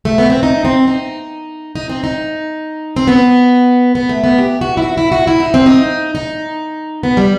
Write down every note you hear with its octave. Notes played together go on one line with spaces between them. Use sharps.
A3
B3
C4
D#4
C4
D#4
D#4
C4
D#4
C4
B3
B3
A3
B3
G4
F#4
E4
F#4
E4
F#4
E4
D#4
C4
D#4
D#4
B3
G3